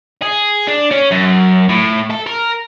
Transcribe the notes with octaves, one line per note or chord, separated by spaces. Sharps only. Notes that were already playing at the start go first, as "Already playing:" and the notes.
G#4
D4
C#4
F#2
A2
A4
A#4